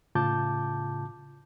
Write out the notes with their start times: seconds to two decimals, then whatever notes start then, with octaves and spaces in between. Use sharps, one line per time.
0.15 A2 C#3 F4 A5 D6 G6